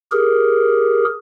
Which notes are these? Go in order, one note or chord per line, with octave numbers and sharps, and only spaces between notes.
G4 G#4 A#4